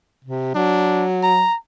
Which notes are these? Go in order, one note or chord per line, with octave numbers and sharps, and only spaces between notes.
C3
F#3 D4
A#5